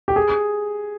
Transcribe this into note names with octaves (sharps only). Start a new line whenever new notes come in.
G4
G#4